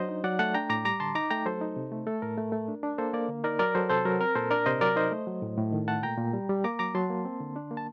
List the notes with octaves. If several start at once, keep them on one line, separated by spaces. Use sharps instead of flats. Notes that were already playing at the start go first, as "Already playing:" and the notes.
Already playing: F#3 D4 C5 D#5
D#4
F#3 D5 F#5
A3 F#5 A5
D4 G5 A#5
A2 A#5 D6
G3 A#5 D6
D3 A5 C6
D#4 A#5 D6
A3 G5 A#5
F#3 A4 C5
D#4
C3
A3
A3 A4
A2 A#4
A3
A3
D4
D4
A#3 A4 C5
A#3 A#4 D5
D3
D#4 A#4 D5
F#3 A#4 D5
F#3 A4 C5
C3 A4 C5
F#3 A#4
C4 A#4
A#2 A4 C5
D4 A#4 D5
C3 C5 D#5
F#3 A#4 D5
D#4 C5 D#5
A3
F#3
A2
A2
D#3
A3 F#5 A5
A#2 G5 A#5
A#2
G3
G3
A#3 A#5 D6
F#3 A#5 D6
F#3 A5 C6
A#3
C4
D3
D4
A#3
A5